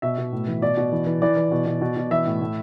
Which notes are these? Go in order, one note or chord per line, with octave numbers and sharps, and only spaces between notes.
B2 E5
B2
A2
E3
B2 D5
B2
E3
E3
E3 D5
E3
B2
B2
B2
B2
E3 E5
A2
A2